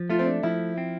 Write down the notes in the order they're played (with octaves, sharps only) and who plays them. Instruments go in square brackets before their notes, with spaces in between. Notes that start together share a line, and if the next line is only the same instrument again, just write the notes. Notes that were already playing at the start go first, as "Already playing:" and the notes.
Already playing: [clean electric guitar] F3
[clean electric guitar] A3 [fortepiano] F4
[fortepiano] C4
D4
[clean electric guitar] F3 [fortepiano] E4
[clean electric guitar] C4